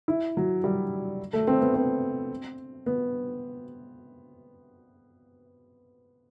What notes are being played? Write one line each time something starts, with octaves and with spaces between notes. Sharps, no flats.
E4
F#3
G3
A3
C4
B3
C4
B3